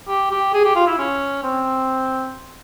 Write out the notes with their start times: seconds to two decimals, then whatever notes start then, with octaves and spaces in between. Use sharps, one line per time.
0.08 G4
0.31 G4
0.54 G#4
0.65 G4
0.76 F4
0.87 E4
0.98 C#4
1.43 C4